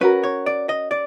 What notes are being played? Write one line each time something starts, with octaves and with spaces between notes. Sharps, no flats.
C#4 F#4 A#4 B4
C#5
D5
D#5
D5